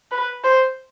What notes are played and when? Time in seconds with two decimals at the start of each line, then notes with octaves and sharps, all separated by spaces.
0.11 B4
0.44 C5